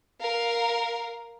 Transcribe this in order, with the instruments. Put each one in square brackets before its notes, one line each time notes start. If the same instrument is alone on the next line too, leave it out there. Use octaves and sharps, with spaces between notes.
[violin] A#4 F5